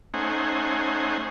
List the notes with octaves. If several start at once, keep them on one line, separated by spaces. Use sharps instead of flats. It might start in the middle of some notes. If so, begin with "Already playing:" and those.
A3 C#4 D#4 C5 F#5 G#5